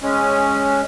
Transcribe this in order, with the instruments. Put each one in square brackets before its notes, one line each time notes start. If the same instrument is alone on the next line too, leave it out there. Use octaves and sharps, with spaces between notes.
[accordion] G#3 C#4